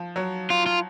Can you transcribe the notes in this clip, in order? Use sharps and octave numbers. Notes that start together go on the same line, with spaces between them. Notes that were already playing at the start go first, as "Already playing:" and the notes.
Already playing: F3
F#3
F4
F4